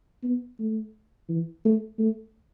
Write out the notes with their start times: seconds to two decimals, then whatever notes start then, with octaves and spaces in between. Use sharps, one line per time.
0.24 B3
0.60 A3
1.29 E3
1.65 A3
1.99 A3